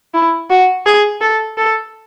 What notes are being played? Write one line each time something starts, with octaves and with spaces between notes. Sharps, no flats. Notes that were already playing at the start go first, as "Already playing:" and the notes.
E4
F#4
G#4
A4
A4